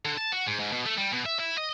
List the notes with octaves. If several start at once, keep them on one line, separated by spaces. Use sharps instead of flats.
D3
A5
F#4
G#2
G#2
B2
A3
G3
B2
E5
E4
D#5